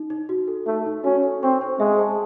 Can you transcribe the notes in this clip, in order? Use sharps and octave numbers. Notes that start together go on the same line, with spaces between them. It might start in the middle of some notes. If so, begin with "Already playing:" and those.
Already playing: D#4
D#4
F#4
A4
A3 D#4
D#4
C#4 F#4
A4
C4 C#6
C5
G#3 E5
A5